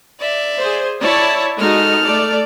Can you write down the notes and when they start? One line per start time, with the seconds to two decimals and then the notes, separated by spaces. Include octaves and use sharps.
0.20 D5 E5
0.58 G#4 C5
1.01 E4 C#5 D5 A5
1.58 G#3 D#4 F#4 A4 F6
2.03 A3 D5